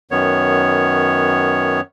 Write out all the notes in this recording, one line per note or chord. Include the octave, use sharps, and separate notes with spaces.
F#2 D#3 B3 C#5